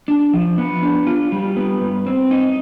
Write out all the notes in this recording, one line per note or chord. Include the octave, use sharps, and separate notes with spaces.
D4
F3
B3
D4
F4
G3
B3
G2
C4
D#4